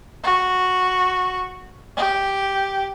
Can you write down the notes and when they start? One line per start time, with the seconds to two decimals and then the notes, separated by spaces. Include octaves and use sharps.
0.24 F#4
1.97 G4